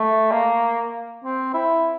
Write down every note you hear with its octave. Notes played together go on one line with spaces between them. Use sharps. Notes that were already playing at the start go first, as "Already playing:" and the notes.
Already playing: A3
A#3
C4
E4